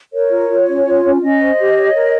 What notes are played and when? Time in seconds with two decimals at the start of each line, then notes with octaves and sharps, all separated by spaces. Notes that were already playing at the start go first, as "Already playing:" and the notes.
0.13 A#4 C#5
0.30 F4
0.49 F4
0.68 C#4
0.86 F4
1.05 C#4
1.22 C#4 D#5
1.41 C5
1.59 G4
1.77 C#5
1.95 A#4